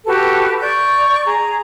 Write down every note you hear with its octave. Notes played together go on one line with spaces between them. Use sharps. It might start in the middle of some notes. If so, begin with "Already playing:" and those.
F#4 G4 A4 B4
D5 C#6 G6
G#4 A#5